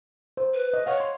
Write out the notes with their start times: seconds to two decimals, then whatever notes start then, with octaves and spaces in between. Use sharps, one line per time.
0.37 C5
0.54 B4
0.74 D#5
0.86 C#5 F5 F#5 C#6
1.00 C6